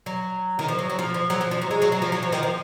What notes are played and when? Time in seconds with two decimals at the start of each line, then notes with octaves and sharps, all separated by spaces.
0.06 F#3
0.59 D#3
0.68 F3
0.79 F#3
0.90 F#3
0.99 F3
1.14 F3
1.30 F#3
1.41 F3
1.51 F3
1.62 F#3
1.71 G#3
1.82 F#3
1.92 F#3
2.02 F3
2.12 F#3
2.23 F3
2.32 D#3
2.43 F3